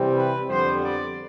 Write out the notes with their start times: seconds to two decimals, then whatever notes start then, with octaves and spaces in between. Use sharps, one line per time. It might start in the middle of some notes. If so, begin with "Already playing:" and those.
Already playing: C3 E3 G3 C4
0.15 B4
0.48 F2 D3 G3 B3 C5
0.82 D5